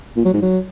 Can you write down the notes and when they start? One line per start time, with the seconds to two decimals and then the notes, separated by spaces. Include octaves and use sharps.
0.16 A#2
0.25 F#3
0.33 G#2
0.42 F#3